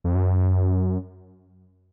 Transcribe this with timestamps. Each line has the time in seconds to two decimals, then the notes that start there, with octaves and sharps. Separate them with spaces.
0.04 F2
0.15 F#2